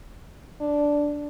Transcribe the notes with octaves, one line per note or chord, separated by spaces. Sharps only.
D4